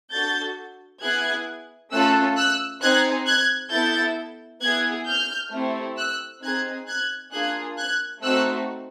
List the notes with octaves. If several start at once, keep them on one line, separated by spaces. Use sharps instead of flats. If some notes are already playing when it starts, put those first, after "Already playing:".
D4 F#4 A4 G6 A6
B3 E4 G#4 F#6 G#6
A3 C#4 F4 A4 E6 F#6
E6 F#6
C4 D#4 G#4 F#6 G#6
F#6 G#6
B3 E4 A4 G6 A6
B3 E4 G#4 F#6 G#6
F6 G6
A3 C4 E4 G4
E6 F#6
C4 D#4 G#4 F#6 G#6
F#6 G#6
A#3 D4 F4 G#4 F#6 G#6
F#6 G#6
A3 C4 D#4 F#4 E6 F#6